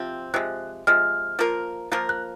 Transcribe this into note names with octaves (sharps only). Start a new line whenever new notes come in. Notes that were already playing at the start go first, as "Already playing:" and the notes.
Already playing: C3 F3 C4
C3 F3 G#3 F#6
C3 F3 G#3 F6
F3 A#3 F4 A#4
F3 A#3 F4 A#4 F#6
F#6